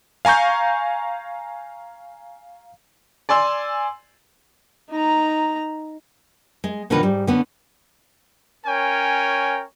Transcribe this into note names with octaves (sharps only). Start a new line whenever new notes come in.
F5 G#5 A#5 C#6 G6
D5 G#5 C6 E6
D#4 A#5
G#3
B2 D3 D#3 F3 A#4 B4
G#2 G3
D3 B3 C#4
C#4 A#4 C#5 G5 G#5